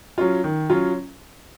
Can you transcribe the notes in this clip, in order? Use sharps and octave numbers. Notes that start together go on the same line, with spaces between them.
F#3 C#4 F4
D#3
F#3 C#4 F4